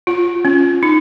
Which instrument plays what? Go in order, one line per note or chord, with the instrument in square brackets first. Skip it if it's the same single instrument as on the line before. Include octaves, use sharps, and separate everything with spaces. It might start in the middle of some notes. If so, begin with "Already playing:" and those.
[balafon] F4
C#4
D#4